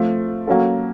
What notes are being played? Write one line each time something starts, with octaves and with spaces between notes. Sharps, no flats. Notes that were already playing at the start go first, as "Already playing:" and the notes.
Already playing: F3 A3 C4 F4
F#3 A#3 C#4 F#4 A4